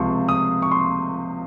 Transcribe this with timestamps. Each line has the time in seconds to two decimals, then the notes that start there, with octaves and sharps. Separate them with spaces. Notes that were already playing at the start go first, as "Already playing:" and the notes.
Already playing: C#2 C3 F3 C6 C#6
0.29 D#6
0.62 C#6
0.72 C6